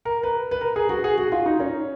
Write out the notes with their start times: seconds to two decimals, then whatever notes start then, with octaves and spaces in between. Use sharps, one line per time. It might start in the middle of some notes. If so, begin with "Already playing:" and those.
0.05 A#4
0.23 B4
0.51 B4
0.61 A#4
0.76 G#4
0.89 F#4
1.04 G#4
1.18 F#4
1.32 F4
1.46 D#4
1.60 C#4